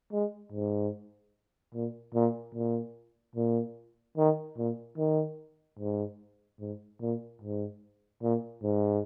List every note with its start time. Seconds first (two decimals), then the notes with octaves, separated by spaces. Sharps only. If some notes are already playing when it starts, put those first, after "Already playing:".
0.12 G#3
0.52 G#2
1.74 A#2
2.15 A#2
2.55 A#2
3.36 A#2
4.17 D#3
4.58 A#2
4.98 D#3
5.79 G#2
6.60 G#2
7.01 A#2
7.42 G#2
8.22 A#2
8.63 G#2